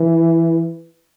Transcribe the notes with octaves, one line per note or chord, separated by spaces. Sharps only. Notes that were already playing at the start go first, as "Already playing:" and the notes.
Already playing: E3